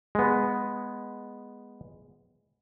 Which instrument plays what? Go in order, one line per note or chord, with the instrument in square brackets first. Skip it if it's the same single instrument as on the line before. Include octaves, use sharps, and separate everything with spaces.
[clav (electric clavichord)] G#3 B3